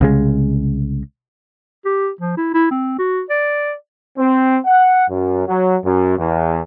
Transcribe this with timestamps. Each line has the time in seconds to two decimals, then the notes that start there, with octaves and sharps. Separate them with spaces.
0.01 C2 C#3 G#3
1.85 G4
2.21 F3
2.37 E4
2.54 E4
2.71 C4
2.99 F#4
3.30 D5
4.18 C4
4.66 F#5
5.10 F#2
5.48 F#3
5.85 F#2
6.18 E2